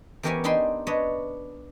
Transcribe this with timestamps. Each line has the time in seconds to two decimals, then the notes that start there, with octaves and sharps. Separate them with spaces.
0.23 E2 G4 A#4 B4 C#5 G#5
0.44 D4 D#4 G5 G#5 B5 C6
0.87 D4 B4 C#5 D#5